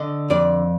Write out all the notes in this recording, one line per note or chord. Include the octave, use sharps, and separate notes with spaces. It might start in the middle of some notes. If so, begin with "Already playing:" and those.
Already playing: D3 D#5
F2 D5